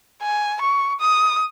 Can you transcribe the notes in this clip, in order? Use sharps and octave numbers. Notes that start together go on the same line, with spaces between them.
G#5
C#6
D#6